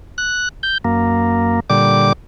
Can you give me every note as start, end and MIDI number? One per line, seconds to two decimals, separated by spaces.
0.18 0.49 90
0.63 0.78 91
0.85 1.60 42
0.85 1.60 58
1.70 2.13 46
1.70 2.13 50
1.70 2.13 55
1.70 2.13 86